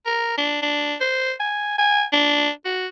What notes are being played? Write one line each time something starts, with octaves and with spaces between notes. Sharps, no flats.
A#4
D4
D4
C5
G#5
G#5
D4
F#4